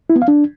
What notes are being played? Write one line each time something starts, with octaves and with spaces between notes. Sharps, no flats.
E4
B3
F5
D4